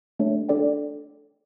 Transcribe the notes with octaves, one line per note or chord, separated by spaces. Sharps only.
A3 D4 A4 C#5
D4 A4 D5 G5